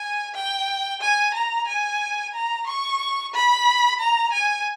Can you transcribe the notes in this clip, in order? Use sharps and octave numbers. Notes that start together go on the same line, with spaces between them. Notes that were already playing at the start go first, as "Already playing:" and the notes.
Already playing: G#5
G5
G#5
A#5
G#5
A#5
C#6
B5
A#5
G#5